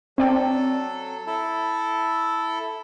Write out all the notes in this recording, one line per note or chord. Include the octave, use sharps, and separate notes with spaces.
F#3 C4 A4 D5 G5
E4 A4